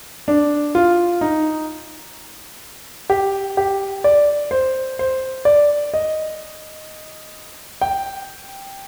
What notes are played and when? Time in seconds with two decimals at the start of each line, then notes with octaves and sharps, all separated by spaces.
0.28 D4
0.75 F4
1.21 D#4
3.10 G4
3.57 G4
4.04 D5
4.51 C5
4.99 C5
5.45 D5
5.94 D#5
7.81 G5